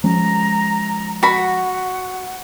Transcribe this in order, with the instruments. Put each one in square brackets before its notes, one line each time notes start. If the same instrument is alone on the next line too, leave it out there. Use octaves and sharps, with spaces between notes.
[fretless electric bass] F3 G#3 C#4 [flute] A#5
[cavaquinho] F#4 B5 [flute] F#5